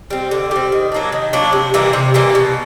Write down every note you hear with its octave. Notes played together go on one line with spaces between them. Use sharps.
G3 C4
D3
G3 C4
D#3
F#3 A#3 D4
D#3
F#3 A#3 D4
C3
E3 G3 A#3
C3
E3 G3 A#3
B2